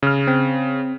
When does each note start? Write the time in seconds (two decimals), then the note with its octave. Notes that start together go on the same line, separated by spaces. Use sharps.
0.03 C#3 F6
0.27 C4